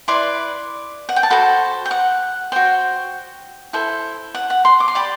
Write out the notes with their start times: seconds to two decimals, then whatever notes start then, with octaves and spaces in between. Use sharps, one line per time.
0.08 E4 B4 D5 C6
1.09 F#5
1.16 G5
1.23 A5
1.30 F#4 A4 C5 B5
1.85 G5
1.91 F#5
2.52 F#4 C5 G5
3.73 E4 A4 C5
4.35 F#5
4.50 F#5
4.65 C6
4.80 D6
4.88 C6
4.95 G4 D5 B5